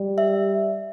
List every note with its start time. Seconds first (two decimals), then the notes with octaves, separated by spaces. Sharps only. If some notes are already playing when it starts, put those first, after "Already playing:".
Already playing: G3
0.18 E5